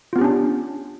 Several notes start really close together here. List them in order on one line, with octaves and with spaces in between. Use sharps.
F4 B3 G4 C#4 D4